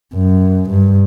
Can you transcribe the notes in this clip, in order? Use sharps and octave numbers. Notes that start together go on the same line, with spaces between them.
F#2
G2